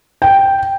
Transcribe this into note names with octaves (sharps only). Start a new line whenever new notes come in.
G5